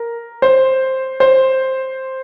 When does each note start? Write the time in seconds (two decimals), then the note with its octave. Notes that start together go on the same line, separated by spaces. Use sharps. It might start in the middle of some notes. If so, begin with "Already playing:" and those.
Already playing: A#4
0.42 C5
1.20 C5